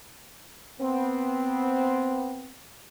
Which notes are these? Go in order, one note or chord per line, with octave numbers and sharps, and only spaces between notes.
B3 C4